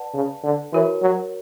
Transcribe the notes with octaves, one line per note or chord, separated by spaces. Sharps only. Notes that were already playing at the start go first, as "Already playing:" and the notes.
Already playing: B4 D5 F#5 A5
C#3
D3
E3 F#4 A#4 C#5
F#3